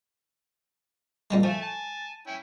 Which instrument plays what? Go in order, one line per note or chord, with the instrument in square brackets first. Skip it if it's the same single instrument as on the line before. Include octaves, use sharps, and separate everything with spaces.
[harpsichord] A#2 G3 G#3
[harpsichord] F3 [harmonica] A3 E5 G#5
[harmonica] G#5 A5
C#4 E4 G5